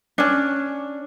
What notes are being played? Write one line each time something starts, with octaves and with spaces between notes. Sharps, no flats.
C#4 D4